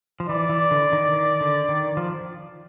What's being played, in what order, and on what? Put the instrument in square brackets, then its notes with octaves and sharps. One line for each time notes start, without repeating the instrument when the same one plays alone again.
[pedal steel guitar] F3
[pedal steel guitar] E3 [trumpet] D5
[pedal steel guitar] E3
D3
D#3
D#3
D3
D#3
F3